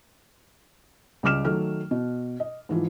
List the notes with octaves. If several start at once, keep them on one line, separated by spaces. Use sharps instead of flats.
C#2 G3 D6 F6 E7
D#3 F#3 A3 F6
B2
D#5
G#2 E3 F3